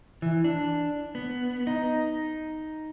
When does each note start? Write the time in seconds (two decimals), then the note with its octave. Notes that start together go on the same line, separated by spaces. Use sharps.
0.22 E3
0.44 D4
1.15 B3
1.67 D#4